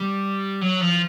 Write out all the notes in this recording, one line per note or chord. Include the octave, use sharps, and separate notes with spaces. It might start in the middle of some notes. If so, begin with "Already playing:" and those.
Already playing: G3
F#3
F3